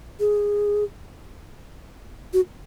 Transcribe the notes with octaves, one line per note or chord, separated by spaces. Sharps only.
G#4
F#4